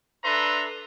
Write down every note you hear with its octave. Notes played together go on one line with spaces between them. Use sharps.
D4 A4 B4 E5 A#5 C6